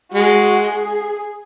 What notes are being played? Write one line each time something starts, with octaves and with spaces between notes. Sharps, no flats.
G#3 F#4
G#4